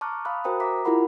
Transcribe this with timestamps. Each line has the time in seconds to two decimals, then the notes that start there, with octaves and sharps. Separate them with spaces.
0.01 A5 A#5 C#6 D6 F6 F#6
0.25 F5 A5 B5 D#6 F#6
0.44 F#4 A#4 C5 G5 A#5 D#6
0.60 E5 A#5 D6 B6
0.85 E4 F4 G4 A#4 F#5 B5